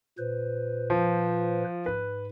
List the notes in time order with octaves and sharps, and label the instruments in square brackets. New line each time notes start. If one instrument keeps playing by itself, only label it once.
[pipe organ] A#2 B4 C5
[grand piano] F3
[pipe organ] G#2 [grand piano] B4